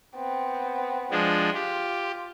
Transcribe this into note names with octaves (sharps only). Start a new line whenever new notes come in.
B3 C4
F3 G#3 D4
F4 G4